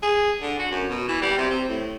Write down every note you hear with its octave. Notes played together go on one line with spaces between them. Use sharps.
G#4
D3
F#4
F#2
B2
E3
G3
C3
C4
A2